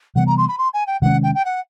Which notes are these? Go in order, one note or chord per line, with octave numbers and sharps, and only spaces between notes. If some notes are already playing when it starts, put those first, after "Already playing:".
C3 E3 G3 B3 F#5
A#5
C6
B5
C6
G#5
G5
C3 D#3 G#3 C#4 F#5
G5
G5
F#5